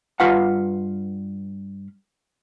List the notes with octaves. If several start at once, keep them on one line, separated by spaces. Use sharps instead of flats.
G2 F4 B4 F5 F#5